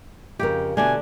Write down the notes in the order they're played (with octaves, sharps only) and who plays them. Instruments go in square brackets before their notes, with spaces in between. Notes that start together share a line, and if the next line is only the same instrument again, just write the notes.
[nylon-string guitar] F2 C#3 A#4 [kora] G4
[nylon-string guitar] B2 A3 [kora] D3 D4 [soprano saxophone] G#5